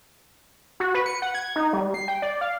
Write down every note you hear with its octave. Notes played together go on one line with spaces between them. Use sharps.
F#4
B4
C#7
F#5
G#6
D#4
G3
C7
G5
D5
F5